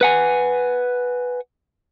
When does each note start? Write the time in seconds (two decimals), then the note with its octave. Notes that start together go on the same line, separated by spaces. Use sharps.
0.01 B4 F#5 G#5